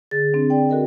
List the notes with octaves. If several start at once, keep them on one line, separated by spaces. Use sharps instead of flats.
D3 G#4 A6
C4 D4
D5 G5
F#4 A4 A#4 D#5 G5